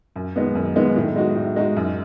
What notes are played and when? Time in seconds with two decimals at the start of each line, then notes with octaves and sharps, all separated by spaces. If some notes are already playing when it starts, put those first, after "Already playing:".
0.16 F#2
0.36 D#3 G#3 B3
0.55 F#2
0.76 D#3 G#3 B3
0.96 A2
1.16 G#3 D#4 F#4
1.35 A2
1.56 G#3 D#4 F#4
1.76 F#2